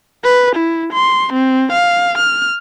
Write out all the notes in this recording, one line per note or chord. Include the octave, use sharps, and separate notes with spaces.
B4
E4
C6
C4
F5
F6